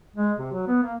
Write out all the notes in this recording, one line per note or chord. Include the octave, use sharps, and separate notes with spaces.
G#3
C3
F#3
B3
A#3